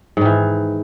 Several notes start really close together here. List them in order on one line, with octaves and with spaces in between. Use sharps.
G#2 D#3 E3